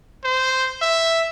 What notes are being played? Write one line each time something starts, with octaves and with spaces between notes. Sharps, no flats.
C5
E5